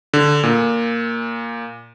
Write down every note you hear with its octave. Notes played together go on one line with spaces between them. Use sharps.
D3
A#2